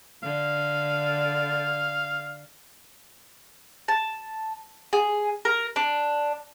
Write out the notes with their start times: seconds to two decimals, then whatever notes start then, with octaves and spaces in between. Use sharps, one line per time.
0.23 D3 F5
3.88 A5
4.93 G#4
5.45 A#4
5.76 D4